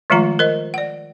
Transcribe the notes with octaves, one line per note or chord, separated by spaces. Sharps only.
D#3 F3 G#3 A3 F4 A#5
A#4 C5 D#5
D5 F#5